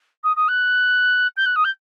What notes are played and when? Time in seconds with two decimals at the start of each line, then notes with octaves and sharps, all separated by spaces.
0.23 D#6
0.36 D#6
0.48 F#6
1.36 G6
1.45 F#6
1.55 D#6
1.64 G6